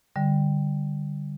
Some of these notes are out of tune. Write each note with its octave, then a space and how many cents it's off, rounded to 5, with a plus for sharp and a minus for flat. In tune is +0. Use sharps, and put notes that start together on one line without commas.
D3 +0 G3 +0